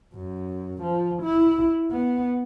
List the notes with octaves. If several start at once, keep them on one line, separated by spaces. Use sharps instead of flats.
F#2
F3
E4
B3